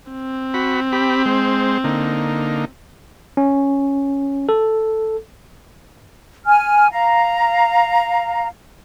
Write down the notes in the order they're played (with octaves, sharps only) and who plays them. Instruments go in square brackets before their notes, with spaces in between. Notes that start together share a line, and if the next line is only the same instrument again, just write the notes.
[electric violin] C4
[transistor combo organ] F#4 B5
G4 B5
G#3 C5
D3 A#3 D#4
[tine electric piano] C#4
A4
[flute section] G#5 F6
F5 A#5